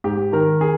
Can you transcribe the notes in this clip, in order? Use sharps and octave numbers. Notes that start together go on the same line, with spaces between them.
G#2 G4
D#3 A#4
G#4